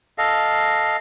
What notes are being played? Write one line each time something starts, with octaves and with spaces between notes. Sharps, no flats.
A4 D#5 F5